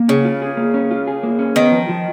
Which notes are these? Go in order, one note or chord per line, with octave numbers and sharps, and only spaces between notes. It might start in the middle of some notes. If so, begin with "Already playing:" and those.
Already playing: A#3
C#3 C#4
F4
G#4
A#3
C#4
F4
G#4
A#3
C#4
D#3 B3
F3
F3